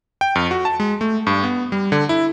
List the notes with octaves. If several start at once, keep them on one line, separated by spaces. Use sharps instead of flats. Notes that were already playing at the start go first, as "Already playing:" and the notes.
G5
F2
F#4
A5
G#3
A3
G2
B3
G3
D3
E4